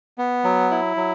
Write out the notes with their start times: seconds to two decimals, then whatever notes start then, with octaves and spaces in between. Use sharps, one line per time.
0.18 B3
0.44 F#3
0.71 E4
0.97 F#3